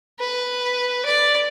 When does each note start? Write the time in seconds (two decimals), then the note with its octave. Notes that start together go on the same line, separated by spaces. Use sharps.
0.20 B4
1.06 D5